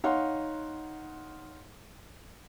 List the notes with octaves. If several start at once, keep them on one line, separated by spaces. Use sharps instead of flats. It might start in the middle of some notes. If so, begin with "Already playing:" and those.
D#4 C#5 F5 F#5 C6